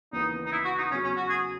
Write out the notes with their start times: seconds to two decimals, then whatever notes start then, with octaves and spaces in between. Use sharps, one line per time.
0.13 D#2 C#3 E3 B3 D#4
0.46 D#4
0.52 E4
0.65 F#4
0.78 D#4
0.91 E2 C#3 F#3 C#4
1.04 C#4
1.17 F#4
1.29 G#4